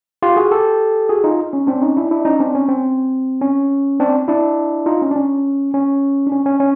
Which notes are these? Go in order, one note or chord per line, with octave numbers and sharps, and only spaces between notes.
F4 G4
F#4 G#4
G4 A4
F#4 G#4
D#4 F4
C#4
C4 D4
C#4 D#4
D4 E4
D4 E4
C#4 D#4
C4 D4
C#4
C4
C#4
C4 D4
D4 E4
D#4 F4
C#4
D4
C#4
C#4
D4
C#4
C#4
C#4